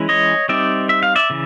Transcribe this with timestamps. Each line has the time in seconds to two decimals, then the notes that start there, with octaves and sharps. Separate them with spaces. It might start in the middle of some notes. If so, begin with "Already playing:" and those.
Already playing: E3 G#3 C#4 E4
0.09 C#5 D#5
0.49 G3 C4 D#4 D5 E5
0.89 E5
1.03 F5
1.15 D5 E5
1.30 C#3 E3